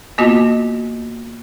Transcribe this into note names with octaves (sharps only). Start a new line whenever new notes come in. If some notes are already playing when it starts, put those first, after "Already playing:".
A#3 B3 F4 F#4 D#5